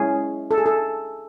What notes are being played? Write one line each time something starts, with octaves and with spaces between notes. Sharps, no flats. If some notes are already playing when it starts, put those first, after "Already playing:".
Already playing: G#3 C#4 E4 G#4
A4
G#4
A4